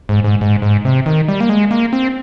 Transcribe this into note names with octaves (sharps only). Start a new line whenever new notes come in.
G#2
G#2
G#2
G#2
C3
D#3
G3
A#3
G#3
A#3
C4